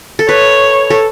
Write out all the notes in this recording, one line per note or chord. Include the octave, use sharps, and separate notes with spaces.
A4
B4 C#5
A4